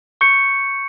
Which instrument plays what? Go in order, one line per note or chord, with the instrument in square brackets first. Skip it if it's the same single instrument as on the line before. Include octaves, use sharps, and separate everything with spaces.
[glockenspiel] C#6 G6 C#7